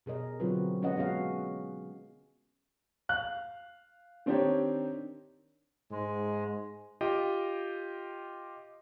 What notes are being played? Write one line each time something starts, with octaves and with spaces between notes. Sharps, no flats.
B2 G#4 A#4 D#5
D3 F#3 C4 F4 F#4 B4
G#3 C#4 B4 D#5 F#5
B3 C#4 F#4 G#4 F5
F5 F#6
D#3 C4 D4 D#4 G4 C#5
G#2 G#3
F4 G4 D#5 G5